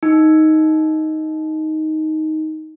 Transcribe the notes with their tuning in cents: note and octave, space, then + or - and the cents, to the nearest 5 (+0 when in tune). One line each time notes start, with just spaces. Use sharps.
D#4 +5